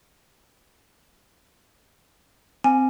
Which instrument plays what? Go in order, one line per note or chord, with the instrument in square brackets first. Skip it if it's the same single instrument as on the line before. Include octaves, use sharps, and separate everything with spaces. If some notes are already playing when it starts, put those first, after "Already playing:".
[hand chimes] C4 [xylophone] G#5